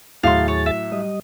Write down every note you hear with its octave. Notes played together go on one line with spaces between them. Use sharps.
D#2 A2 F#3 G#4 F5 C6 A6
C#5
E5
G3 D#5